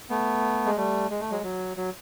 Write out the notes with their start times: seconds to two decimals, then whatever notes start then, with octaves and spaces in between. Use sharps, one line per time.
0.09 A3 B3
0.66 G#3
0.77 G3 A3
1.10 G#3
1.20 A3
1.31 F#3 G#3
1.44 F#3
1.77 F#3